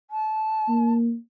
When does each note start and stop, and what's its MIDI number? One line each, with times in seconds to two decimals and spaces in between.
0.11 0.93 81
0.68 1.15 58